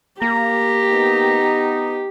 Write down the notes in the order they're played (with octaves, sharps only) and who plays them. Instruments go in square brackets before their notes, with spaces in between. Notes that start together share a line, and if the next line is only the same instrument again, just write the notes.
[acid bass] A#3 [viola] G4 [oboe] A#5
[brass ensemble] B3 D#4